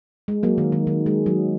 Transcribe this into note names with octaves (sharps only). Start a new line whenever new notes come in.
G#3
F#3 A#3
D#3
D#3
D#3
G#3
F#3